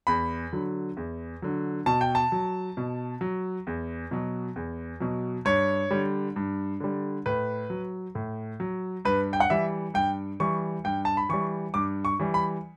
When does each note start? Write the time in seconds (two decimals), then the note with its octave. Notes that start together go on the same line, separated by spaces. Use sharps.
0.07 E2 B5
0.53 D3 F#3
0.97 E2
1.42 D3 F#3
1.86 B2 A5
2.01 G5
2.15 A5
2.32 F#3
2.77 B2
3.21 F#3
3.67 E2
4.11 B2 F#3
4.56 E2
5.00 B2 F#3
5.45 G2 C#5
5.91 D3 G3
6.36 G2
6.80 D3 G3
7.26 A2 B4
7.70 F#3
8.15 A2
8.60 F#3
9.05 G2 B4
9.33 G5
9.40 F#5
9.50 E3 G3 E5
9.94 G2 G5
10.40 E3 G3 C#6
10.84 G2 G5
11.05 A5
11.17 B5
11.29 E3 G3 C#6
11.74 G2 D6
12.05 C#6
12.19 E3 G3
12.34 B5